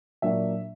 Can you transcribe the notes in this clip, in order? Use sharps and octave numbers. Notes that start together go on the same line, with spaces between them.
A#2 F#3 A#3 D4 E5